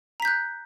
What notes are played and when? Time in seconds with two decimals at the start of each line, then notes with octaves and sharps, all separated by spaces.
0.20 A#5
0.22 B6
0.25 G6
0.28 F#6